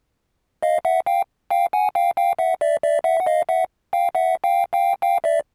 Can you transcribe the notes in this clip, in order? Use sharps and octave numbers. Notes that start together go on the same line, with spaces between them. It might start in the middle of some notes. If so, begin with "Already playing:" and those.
D#5 F5
E5 F#5
F5 G5
F5 G5
F#5 G#5
F5 G5
F5 G5
E5 F#5
D5 E5
D5 E5
E5 F#5
F#5
D#5 F5
E5 F#5
F5 G5
E5 F#5
F5 G5
F5 G5
F5 G5
D5 E5